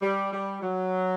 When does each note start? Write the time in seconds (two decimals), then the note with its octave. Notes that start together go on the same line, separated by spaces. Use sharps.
0.02 G3
0.33 G3
0.62 F#3